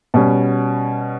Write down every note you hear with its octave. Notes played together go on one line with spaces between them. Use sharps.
B2 G3 C#4